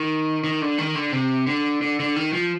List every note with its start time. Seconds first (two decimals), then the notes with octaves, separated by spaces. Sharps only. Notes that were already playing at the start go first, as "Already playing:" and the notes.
Already playing: D#3
0.44 D#3
0.62 D3
0.78 D#3
0.95 D3
1.12 C3
1.47 D3
1.82 D3
2.00 D3
2.16 D#3
2.33 F3